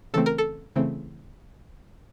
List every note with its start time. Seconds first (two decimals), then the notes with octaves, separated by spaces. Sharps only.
0.14 C#3 E3 A3 C4 A4
0.26 A#4
0.38 A4
0.76 C#3 E3 A3 C4